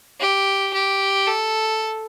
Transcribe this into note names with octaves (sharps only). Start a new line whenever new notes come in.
G4
G4
A4